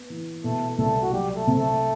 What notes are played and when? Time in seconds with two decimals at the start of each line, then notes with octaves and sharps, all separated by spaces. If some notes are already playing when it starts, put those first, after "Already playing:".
Already playing: B3
0.10 E3
0.44 B2 A3 A4
0.78 C2 A3 A4
1.02 F#4
1.12 F#3 G3 G4
1.36 A3 A4
1.47 C3
1.58 A3 A4